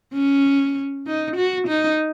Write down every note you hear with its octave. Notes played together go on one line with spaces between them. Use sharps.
C#4
D#4
F#4
D#4